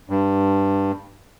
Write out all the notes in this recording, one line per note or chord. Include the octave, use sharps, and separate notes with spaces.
G2